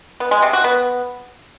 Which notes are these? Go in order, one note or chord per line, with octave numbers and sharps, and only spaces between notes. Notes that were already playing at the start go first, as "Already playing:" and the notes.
B3
G#3
C3
F#4
B3